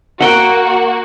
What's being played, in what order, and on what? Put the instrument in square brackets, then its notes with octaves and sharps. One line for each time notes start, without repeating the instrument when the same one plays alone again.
[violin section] A#3 F#4 [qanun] F#5 G5